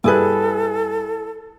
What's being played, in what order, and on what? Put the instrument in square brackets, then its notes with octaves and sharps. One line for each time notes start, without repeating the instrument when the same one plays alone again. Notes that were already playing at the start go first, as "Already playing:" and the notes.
[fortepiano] G2 [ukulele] E4 G#4 B4 [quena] A4